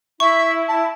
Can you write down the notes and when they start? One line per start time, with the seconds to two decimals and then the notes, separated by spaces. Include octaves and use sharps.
0.20 E4 E5 C#6
0.68 A5